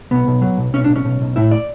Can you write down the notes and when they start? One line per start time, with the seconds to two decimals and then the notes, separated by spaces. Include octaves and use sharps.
0.11 B1 B3
0.27 B1
0.42 F#3
0.58 B1
0.73 B1 C#4
0.84 D4
0.89 B1
0.96 C#4
1.05 B1
1.21 B1
1.36 A2 E4
1.52 D5